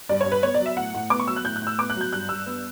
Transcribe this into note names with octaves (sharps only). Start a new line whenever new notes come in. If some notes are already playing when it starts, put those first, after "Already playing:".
G2 D5
C#5
G2
B4
B3 C#5
D5
F#3
E5
A2 F#5
A2
B3 D6
C#6
F#3 E6
F#6
A2 G6
F#6
A2
E6
B3 D6
F#6
F#3
G6
G2 F#6
G2 E6
B3